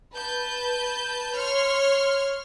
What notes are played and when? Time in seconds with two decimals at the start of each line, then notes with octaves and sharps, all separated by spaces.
0.13 B4 A5 G6
1.34 C#5 C6 F6